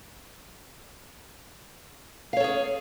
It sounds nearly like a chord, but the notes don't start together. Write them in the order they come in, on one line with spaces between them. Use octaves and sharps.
F5 C#5 A4 G#4